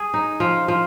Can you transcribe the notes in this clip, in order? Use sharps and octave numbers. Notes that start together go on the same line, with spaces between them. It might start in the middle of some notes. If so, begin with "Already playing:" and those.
Already playing: G#4
D#4
F3
F3